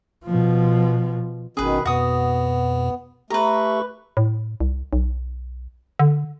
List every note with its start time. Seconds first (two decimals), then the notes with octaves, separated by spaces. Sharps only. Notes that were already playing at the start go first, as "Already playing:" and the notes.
0.25 B2 F3
1.57 G#1 B2 D#3 C#4 G#4 B4
1.85 F2 B2 B3 F#4 D#6
3.30 A3 G4 A4 B4 A#5 C#6
4.17 A2
4.60 C2
4.93 B1
5.99 D3